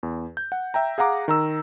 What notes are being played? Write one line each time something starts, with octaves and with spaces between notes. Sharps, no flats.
E2
G6
F#5
E5 G5 A#5
G#4 F5 F#5 A#5 D6
D#3 A#5 E6